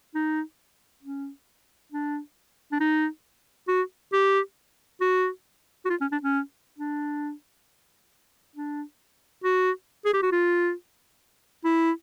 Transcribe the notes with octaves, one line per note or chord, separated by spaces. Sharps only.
D#4
C#4
D4
D4
D#4
F#4
G4
F#4
F#4
F4
C#4
D4
C#4
D4
D4
F#4
G#4
G4
F#4
F4
E4